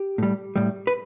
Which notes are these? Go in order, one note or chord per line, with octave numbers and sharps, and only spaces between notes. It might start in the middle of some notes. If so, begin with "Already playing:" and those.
Already playing: G4
A2 G3
A2 G3
B4